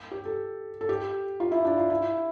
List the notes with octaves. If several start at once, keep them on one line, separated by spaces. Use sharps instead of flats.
G4
A4
A4
G4
F4
E4
D4
F4
E4